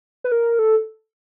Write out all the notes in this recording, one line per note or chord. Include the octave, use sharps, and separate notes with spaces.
B4
A#4
A4